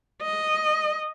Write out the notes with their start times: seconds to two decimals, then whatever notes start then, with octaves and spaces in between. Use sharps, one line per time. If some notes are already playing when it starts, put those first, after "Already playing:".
0.22 D#5